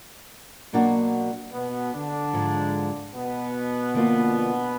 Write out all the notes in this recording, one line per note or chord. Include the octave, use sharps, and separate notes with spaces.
B2 F#3 A#3 D4 F#4
B2 B3
D3 D4
G#2 F3 G#3
B2 B3
D3 F3 A#3 D4 F4